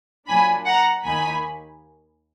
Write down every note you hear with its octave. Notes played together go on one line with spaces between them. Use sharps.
A#2 F#3 D4 G#5 B5
F#5 A#5
D#2 D#3 A#3 D#4 G#5 B5